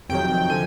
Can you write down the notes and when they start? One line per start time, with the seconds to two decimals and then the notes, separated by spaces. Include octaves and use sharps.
0.09 F2 C3 D#3 F#3 G5
0.50 D3 F3 G#5